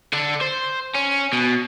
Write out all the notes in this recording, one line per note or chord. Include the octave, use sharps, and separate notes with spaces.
D3 A4
C5
C#4
B2